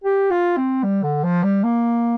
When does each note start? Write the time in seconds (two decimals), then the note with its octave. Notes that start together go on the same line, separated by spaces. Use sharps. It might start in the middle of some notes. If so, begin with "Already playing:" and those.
0.04 G4
0.31 F4
0.57 C4
0.84 G3
1.03 D3
1.24 F3
1.43 G3
1.63 A#3